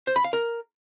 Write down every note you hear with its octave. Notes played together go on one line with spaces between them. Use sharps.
C5
B5
F5
A#4